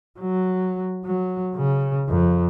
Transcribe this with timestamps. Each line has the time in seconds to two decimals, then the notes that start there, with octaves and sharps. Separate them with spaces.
0.20 F#3
1.05 F#3
1.55 C#3
2.08 F2